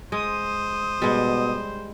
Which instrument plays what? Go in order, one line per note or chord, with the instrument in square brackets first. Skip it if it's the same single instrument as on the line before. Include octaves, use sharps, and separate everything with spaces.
[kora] G#3 [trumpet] C5 [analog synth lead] D#6
[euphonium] B2 [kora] G3 G#3